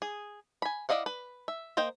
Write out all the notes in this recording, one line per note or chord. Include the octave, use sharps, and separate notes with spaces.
G#4
G#5 B5
E4 D5 D#5 F5 F#5
B4
E5
A#3 C5 D#5 G5